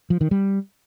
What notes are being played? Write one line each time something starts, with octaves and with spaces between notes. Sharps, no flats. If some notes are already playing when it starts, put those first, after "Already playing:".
F3
D#3
G3